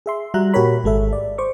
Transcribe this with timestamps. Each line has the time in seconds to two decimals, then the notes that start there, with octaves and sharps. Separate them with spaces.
0.06 G#4 E5 C6
0.34 G3 F#4 E5 A#5 F#6
0.54 A#2 F#4 G4 A#4 C#5 B5
0.84 G#1 G#3 A4 E5
1.13 D5
1.38 C5 C#6 D6